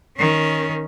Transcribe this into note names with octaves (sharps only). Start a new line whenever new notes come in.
D#3 C#4